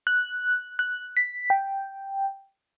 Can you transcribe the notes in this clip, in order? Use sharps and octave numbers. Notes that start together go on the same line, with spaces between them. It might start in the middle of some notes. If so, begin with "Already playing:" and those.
F#6
F#6
B6
G5